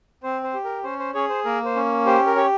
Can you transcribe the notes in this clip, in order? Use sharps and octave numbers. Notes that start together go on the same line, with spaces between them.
C4 C5
C5
G4
A#4
C#4 C5
C5
C#4 G#4 C#5
C5
A#3 A#4
C5
C#4
G4 C5
A#4
G4 C#5